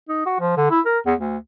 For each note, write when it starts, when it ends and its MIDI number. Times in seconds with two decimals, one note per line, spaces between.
0.09 0.21 63
0.26 0.35 66
0.40 0.57 53
0.57 0.68 50
0.71 0.80 64
0.86 0.98 70
1.06 1.14 40
1.19 1.37 38